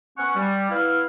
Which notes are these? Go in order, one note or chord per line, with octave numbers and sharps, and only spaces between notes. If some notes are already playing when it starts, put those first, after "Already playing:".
B3 C#4 F#5 C#6
G3
B3 E4 F5